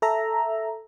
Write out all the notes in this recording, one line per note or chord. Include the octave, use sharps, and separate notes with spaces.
A4 E5 A#5